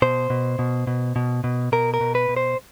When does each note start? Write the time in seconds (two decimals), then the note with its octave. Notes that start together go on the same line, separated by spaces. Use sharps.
0.02 B2 C5
0.30 B2
0.59 B2
0.87 B2
1.16 B2
1.44 B2
1.72 B2 A#4
1.94 A#4
2.01 B2
2.15 B4
2.29 B2
2.37 C5